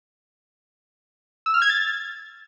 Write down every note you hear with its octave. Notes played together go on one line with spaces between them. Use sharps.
E6
F6
G#6
A6